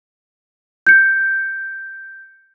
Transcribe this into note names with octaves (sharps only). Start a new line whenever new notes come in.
G6 C#7